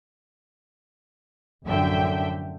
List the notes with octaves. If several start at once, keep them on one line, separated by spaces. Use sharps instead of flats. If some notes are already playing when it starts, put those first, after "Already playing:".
A1 F#2 D3 F3 E5 G5